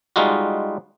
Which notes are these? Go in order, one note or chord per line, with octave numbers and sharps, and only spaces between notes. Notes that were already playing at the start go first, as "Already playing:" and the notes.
G3 G#3 D#4 F4 F#4